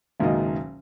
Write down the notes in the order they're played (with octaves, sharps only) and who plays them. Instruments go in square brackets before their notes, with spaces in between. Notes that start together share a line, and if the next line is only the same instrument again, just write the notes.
[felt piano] F#1 C#2 B2 D#3 A#3 D#5